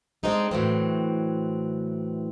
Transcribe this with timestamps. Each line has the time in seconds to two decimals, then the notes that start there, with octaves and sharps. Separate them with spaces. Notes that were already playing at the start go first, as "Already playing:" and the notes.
0.23 G#3 C4 D4 D#4 A4
0.51 A2 E3 F#3 C4